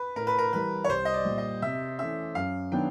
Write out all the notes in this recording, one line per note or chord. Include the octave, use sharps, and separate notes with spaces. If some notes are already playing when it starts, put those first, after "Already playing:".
Already playing: B4
A2 A#4
B4
A#4
E3 G3 B4
C#5
C2 C5
D#5
D5
A#2 G3
D#5
C3 E5
E3 A3 C#4 E5
F#2 F5
D#3 F#3 B3 D4 G5